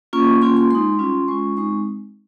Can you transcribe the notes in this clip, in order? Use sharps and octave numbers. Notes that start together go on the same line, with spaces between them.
A#3 C#4 F4 C#6
A#3 C#4 F4 C6
C6
G#3 D#4 C6
G3 C#4 F4
G#3 C#4 F4 C#6
G#3 C4 D#4 C#6